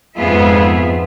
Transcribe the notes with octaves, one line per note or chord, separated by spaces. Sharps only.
F2 G#2 B3 F4 G#4 E5